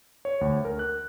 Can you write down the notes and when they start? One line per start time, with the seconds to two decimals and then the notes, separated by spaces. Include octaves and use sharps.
0.25 C#5
0.41 D2
0.65 A#4
0.79 F#6